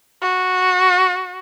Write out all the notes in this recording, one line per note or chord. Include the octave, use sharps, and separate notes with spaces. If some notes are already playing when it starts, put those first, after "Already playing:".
F#4